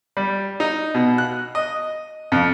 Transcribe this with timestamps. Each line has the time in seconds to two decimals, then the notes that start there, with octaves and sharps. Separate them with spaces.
0.17 G3
0.60 D#4
0.94 B2
1.18 F#6
1.55 D#5
2.32 F2